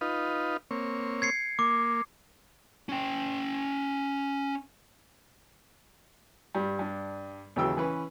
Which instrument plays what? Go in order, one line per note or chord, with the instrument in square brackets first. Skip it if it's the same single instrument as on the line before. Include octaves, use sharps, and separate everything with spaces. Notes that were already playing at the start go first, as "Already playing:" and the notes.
[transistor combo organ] D#4 F4 B4
A#3 C4 C#5
[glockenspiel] G#6 C7 C#7
[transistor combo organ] A#3 [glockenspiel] D6
[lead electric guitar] C#4 G5
[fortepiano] G2 G3
G2 D4
D#2 C#3 E3 F#3 G5 E6
E3 C#4 B4